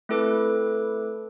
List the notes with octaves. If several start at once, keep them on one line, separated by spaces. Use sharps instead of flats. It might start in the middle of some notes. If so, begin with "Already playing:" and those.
A3 C4 E4 A4 B4 D6